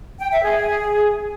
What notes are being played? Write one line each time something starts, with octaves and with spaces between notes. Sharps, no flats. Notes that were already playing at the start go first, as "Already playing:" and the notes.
G5
E5
G#4